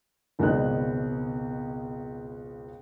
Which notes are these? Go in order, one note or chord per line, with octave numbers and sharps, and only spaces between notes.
G#1 C#2 B2 B3 D#5 F#6